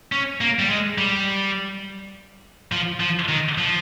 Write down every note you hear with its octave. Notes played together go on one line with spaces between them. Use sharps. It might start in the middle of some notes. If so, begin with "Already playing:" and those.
C#4
A#3
G3
G#3
G3
F3
F3
D#3
F3